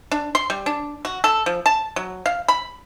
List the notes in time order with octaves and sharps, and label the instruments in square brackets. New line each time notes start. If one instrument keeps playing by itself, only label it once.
[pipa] D4
C6
G3
D4
F#4
A4
F3
A5
F#3
F5
B5